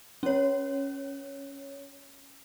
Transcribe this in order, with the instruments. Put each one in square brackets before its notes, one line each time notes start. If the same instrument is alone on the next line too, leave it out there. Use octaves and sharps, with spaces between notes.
[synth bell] C#4 C#5